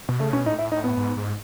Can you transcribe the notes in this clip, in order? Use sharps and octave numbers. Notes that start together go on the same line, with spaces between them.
B2
C#3 A3
B2 C#4
A2 D#4
E4
D#4
B3
G#2
G#2